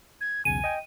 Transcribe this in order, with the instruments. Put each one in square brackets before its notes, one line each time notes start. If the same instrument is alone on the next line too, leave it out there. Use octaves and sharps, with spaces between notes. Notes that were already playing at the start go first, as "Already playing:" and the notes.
[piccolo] G#6
[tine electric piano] B1 E2 C#3 [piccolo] G#5 [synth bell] D#7
[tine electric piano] D#5 G5